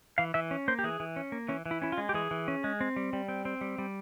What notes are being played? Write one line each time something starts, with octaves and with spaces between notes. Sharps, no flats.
E3 F5
E3 E5
C#4
A#3 C5
G4
E3 G#4
E3
C#4
A#3
E3 C#4
E3
E4
C#4 E4
F4
G#3
G4
E3 G#4
E3
C#4
G#3
C4
G3
G3
C4
C4
G3
G3